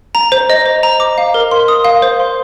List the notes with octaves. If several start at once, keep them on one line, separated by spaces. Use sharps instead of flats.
A#5
C5
D#5
C5
A#5
D6
F5
A#4
C6
D#6
F5
C5
C6